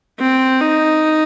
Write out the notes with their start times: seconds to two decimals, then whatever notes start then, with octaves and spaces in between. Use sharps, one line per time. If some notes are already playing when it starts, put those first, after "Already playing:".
0.20 C4
0.61 D#4